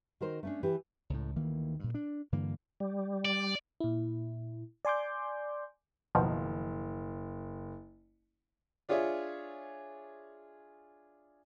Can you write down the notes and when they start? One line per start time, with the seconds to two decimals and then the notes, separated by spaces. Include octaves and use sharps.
0.21 D#3 F#4 A#4 C5
0.43 A3 C#4 D4
0.63 E3 G4
1.10 C#2 A2
1.36 D2 D#3 E3 A#3
1.80 G2 A#2
1.94 D4
2.32 G2 D3 E3 A#3
2.80 G3
3.25 D5
3.80 A#2 E4
4.85 D5 G#5 C6 D6 G6
6.15 F#1 B2 D#3 F3
8.89 D4 F4 G#4 C#5 E5